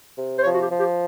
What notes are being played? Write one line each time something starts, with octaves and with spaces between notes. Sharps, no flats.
C3
C5
F3 C#5
F#4
G4
F3
G4